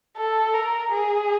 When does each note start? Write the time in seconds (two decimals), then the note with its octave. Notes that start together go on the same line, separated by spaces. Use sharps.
0.17 A4
0.54 A#4
0.92 G#4